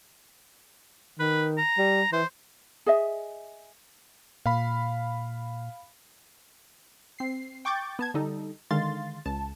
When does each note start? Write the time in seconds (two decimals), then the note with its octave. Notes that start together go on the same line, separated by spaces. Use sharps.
1.19 D#3 B4
1.57 A#5
1.78 G3
2.12 E3 C5
2.86 G#4 D#5 E5
4.46 A#2 F5 B5
7.19 C4 C7
7.65 G5 C#6 D6 G6 A6
7.99 B3 A5 G#6
8.14 D3 G3 D#4 A4
8.71 D3 D#3 G#3 F5 C6 A6
9.25 C#2 A5